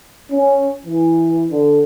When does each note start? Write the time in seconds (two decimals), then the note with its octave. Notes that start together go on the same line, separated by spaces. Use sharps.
0.32 C#4
0.86 E3
1.51 D3